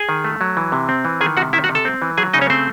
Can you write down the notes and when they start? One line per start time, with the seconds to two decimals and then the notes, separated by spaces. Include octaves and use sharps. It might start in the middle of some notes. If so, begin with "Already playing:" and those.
Already playing: G#4 G#5
0.09 D#3
0.24 A3
0.41 F#3
0.57 E3
0.72 C3
0.89 C4
1.05 E3
1.21 D#3 G#4 G#5
1.37 C3 F#4 F#5
1.53 D#3 E4 E5
1.64 F#4 F#5
1.69 C3
1.75 A4 A5
1.85 C4
2.02 E3
2.17 F#3 G#4 G#5
2.34 C#3 D#4 D#5
2.41 C#4 C#5
2.50 A3 C4 C5